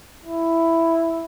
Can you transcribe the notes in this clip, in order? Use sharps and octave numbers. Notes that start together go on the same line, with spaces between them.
E4